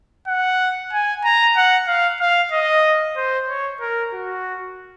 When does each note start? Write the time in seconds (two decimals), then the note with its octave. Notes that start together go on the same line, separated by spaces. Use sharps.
0.28 F#5
0.92 G#5
1.24 A#5
1.56 F#5
1.88 F5
2.20 F5
2.52 D#5
3.17 C5
3.49 C#5
3.81 A#4
4.13 F#4